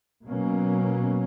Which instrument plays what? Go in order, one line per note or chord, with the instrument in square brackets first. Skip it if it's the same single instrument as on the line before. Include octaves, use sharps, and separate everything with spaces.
[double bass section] B2 F#3 A#3 C#4